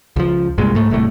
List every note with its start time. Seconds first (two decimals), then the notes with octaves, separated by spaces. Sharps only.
0.16 C#2 F3
0.58 C2 G2 A#2 G#3
0.75 G#2 A3
0.90 D1 C2 A2 A3